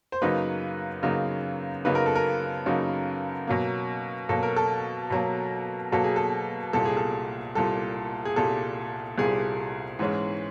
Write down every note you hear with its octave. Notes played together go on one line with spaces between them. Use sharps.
C5
F#2 C#3 F#3 A#3 D#4 B4
F#2 C#3 F#3 A#3 D#4
F#2 C#3 F#3 A#3 D#4 B4
A#4
A4
A#4
F#2 C#3 F#3 A#3 D#4
B2 F#3 A#3
B2 F#3 A#3 A4
A#4
A4
B2 F#3 A#3
B2 F#3 A#3 A4
G#4
A4
C2 A#2 G3 A4
G#4
A4
C2 A#2 G3 A4
G#4
C2 A#2 G3 A4
C2 A#2 G3 G#4
G#2 E3 G#3 C#4